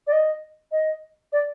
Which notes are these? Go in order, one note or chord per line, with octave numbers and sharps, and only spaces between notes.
D5
D#5
D#5
D5